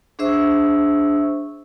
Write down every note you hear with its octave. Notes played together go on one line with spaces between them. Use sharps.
D4 G#4 C5 E5 C#6 E6